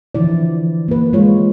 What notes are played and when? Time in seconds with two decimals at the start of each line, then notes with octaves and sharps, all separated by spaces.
0.15 D3 E3 F3 E4 D5
0.88 A#3 B4
1.13 G#3 F4 C#5